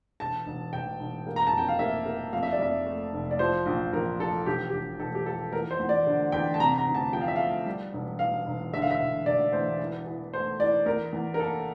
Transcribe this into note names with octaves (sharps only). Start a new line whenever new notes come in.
E1 A5
E1
E1 G5
E1
A#3
A#5
A5
F2 G5
F5
A#3 E5
A#3
F2 F5
E5
D5
F2 E5
A3
F1
D5
F3 C5
A#1
A#1 A#4
F3 A4
E1 G4
E1 G4
E1 A4
G4
F3 A4
E2 A#4
C5
E2
D5
D3
E2 G5
A5
C3 A#5
A#5
D2
A5
F3 G5
F5
E5
A3 F5
G3
E1
E2 F5
E1
D3 E5
F5
E5
E1
E1 D5
E2 C5
E3
E3
A3 C5
E3 D5
E2 A#4
E2
A#4
A#3 A4